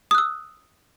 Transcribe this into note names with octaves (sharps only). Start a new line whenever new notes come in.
D#6 E6 F#6